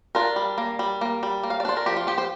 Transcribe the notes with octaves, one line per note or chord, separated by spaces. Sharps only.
D4 F4 A#4
G3
A#3
G3
A#3
G3
A#3
F5
D5
D4 C5
A#4
F3 G4
F4
F3 G4
G4 C5